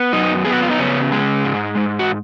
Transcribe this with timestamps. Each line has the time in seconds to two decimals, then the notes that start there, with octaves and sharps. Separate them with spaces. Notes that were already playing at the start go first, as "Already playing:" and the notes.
Already playing: B3
0.13 F#2 D#4
0.45 B3 G#4
0.53 F#4
0.62 F4
0.70 D#4
0.79 C#3 C#4
1.12 G#3
1.45 G#2
1.77 G#2
1.99 F#4